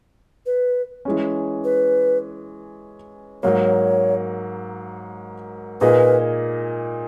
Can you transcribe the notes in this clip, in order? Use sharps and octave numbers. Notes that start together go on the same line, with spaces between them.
B4
E3 G#3 C#4
B4
G#2 F#3 A#3 C#5
A#2 A#3 D#4 G#4 B4 D#5